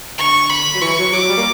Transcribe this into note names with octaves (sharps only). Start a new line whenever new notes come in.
D3 C#6
B5
F#3
E3 C#6
F#3
F#3 D6
G3
A#3